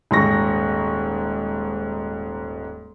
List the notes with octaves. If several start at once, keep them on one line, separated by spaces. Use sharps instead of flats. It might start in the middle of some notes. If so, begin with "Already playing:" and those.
D#1 G#2 C#6 A#6